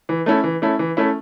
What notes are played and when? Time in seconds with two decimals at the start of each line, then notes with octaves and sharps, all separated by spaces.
0.09 E3
0.26 A3 C#4 E4
0.44 E3
0.62 A3 C#4 E4
0.79 E3
0.97 A3 C#4 E4